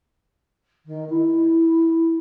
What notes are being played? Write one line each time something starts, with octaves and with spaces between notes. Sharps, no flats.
D#3
E4